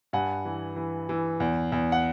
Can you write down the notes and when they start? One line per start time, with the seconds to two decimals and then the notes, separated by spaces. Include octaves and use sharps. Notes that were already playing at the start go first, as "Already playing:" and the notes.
0.13 G2 F#5 G#5
0.45 E3
0.76 E3
1.09 E3
1.40 E2
1.72 E2
1.92 F#5